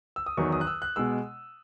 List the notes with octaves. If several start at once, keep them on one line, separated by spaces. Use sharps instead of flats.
E6
D#6
E2 D#3 F#3 C#6
D#6
F#6
E6
F#6
B2 G#3 E6